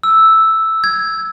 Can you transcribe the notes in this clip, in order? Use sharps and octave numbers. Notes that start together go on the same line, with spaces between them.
E6
G#6